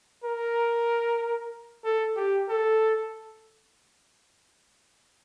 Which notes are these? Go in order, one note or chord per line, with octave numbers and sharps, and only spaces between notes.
A#4
A4
G4
A4